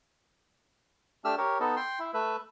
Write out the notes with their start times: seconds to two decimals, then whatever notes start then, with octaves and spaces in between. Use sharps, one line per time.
1.25 A3 D4 G4 E6 F6
1.38 G4 A#4 C#5
1.60 B3 D#4 A4
1.77 G5 C6
2.00 E4
2.14 A3 B4 E5